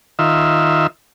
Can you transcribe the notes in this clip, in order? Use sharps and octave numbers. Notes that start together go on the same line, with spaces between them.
D#3 F4 E5